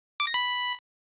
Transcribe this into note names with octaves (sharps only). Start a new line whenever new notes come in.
D6
A#6
B5